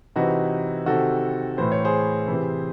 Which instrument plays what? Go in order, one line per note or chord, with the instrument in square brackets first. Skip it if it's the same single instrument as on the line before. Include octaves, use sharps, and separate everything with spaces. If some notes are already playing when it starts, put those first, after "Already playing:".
[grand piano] C3 E3 D#4 F#4
C3 D#3 F#4 A4
A2 E3 C5
C#5
G#4 C5
C3 E3